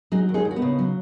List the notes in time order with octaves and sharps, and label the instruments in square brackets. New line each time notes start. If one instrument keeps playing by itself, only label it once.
[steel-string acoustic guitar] F#3 D#4 G#4
D#2
D#4 G#4
D#2
F#4
B3 D#4
C#3
F#3